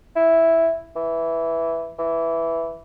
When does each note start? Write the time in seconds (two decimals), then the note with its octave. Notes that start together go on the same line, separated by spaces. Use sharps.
0.16 E4
0.96 E3
1.99 E3